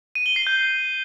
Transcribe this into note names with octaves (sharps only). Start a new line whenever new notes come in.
D#7
G7
C7
G6